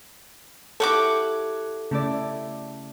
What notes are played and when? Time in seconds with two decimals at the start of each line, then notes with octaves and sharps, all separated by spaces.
0.80 E4 G4 A4 C#5 F#5 D6
1.91 C#3 A3 E4 D5